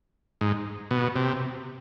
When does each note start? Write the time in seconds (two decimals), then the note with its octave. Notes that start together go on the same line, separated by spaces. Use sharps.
0.41 G#2
0.91 B2
1.16 C3